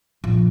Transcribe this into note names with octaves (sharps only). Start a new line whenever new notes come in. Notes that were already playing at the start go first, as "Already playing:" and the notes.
A#1